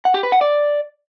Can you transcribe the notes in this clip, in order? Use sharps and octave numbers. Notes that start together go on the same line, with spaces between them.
F#5
G4
B4
F#5
D5